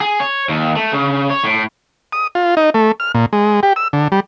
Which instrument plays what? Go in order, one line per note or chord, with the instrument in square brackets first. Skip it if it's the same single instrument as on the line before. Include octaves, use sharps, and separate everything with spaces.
[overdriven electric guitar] G#4
C#5
D#2
A3
C#3
C#5
A2
[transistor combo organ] D#6
F4
D#4
A3
F6
A#2
G#3
G4
E6
D3
G3